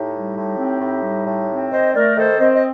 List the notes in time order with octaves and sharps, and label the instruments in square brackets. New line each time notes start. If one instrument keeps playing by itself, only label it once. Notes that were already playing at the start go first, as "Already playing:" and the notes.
Already playing: [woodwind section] A2 D#4 G4
G3
A2
C4
A2
G3
A2
C4
D#3 C5 D#5
A3 A#4 D5
D#3 A4 C5
C4 C5 D#5
D#5